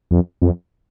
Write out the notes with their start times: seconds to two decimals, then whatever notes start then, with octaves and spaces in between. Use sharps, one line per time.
0.11 F2
0.42 F2